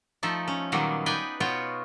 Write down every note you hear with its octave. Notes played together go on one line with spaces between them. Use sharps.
F3 A3 D#4 A4
C#4
A#2 D#3 F#3 G3 A#3 B3
D#4 B4 D5 G5 G#5
B2 B3 F4 F#4 C#5 G5